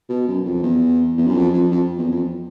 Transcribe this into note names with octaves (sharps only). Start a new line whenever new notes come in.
B2
F#2
F2
E2
E2
F#2
F2
F2
F2
E2
F2